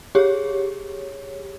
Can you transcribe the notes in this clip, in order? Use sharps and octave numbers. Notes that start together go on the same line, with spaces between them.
G4 G#4 C#5